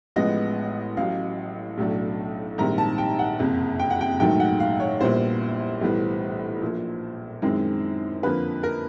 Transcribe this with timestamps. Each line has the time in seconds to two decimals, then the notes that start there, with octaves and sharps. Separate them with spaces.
0.16 A1 A2 F3 G#3 B3 D#5
0.97 A1 A2 F#3 F5
1.78 B1 A2 F#3 A3 D4
2.58 A#1 G#2 D#3 G3 C4 A#5
2.78 A5
2.98 G5
3.19 F#5
3.39 F#1 F2 C3
3.79 G5
3.91 F#5
4.01 G5
4.19 A#1 G#2 D#3 F#3 A3 G5
4.40 F#5
4.60 F5
4.80 C#5
5.01 A#1 A#2 G3 B3 E4 C5
5.81 B1 A2 E3 G3 B3
6.62 A#1 A#2 F3
7.42 F#2 D#3 G#3 C4 E4
8.23 F2 D3 F3 A#3 B4
8.63 A#4